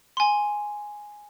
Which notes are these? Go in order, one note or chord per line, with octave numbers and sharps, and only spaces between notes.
G#5 C6